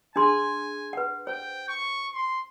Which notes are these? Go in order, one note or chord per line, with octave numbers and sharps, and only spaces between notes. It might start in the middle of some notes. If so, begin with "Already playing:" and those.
D4 G#4 G#5 C6
B4 F#5
C5 G5
C#6
C6